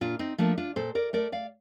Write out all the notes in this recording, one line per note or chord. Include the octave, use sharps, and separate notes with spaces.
A#2 D4 F4
C4 D#4
F3 A3 A#3 D4
D4 F4
A#2 A4 C5
A#4 D5
A3 A#4 D5
D5 F5